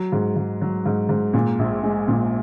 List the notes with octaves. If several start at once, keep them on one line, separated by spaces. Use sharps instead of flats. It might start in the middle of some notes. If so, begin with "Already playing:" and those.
Already playing: F#3
G#2
G#2
F#3
G#2
G#2
A#2
A#1
G#3
A#2